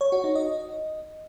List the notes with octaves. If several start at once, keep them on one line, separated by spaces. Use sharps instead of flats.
C#5
F#4
D#4
D#5